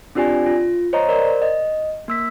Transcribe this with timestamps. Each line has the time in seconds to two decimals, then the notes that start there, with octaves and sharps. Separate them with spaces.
0.15 C4 D4 F4 G4 D5 G#5
0.46 F4
0.93 C5 C#5 D#5 A#5
1.09 A#4 C5 D5
1.42 D#5
2.08 A#3 E6 B6